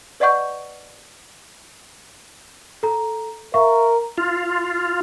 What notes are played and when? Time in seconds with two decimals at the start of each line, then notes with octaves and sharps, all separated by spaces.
0.20 B4 D5 D#5 F#5 C#6 G6
2.83 A4 A#5
3.54 A#4 E5 F5 C#6
4.18 F4